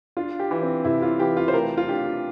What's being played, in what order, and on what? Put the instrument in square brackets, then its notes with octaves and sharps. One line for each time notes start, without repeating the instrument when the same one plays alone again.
[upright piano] D4 [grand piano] F4
[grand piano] G4
[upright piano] E3
[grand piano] C4
[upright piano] C3 [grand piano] E4
[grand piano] F4
[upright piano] E3 [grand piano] G4
[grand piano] F4
C5
[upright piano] A3 [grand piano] A#4
[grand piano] F4
[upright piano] D4 [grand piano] G4